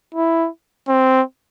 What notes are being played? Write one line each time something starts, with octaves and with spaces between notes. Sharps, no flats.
E4
C4